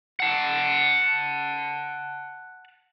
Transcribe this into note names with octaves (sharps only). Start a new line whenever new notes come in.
F#5 A5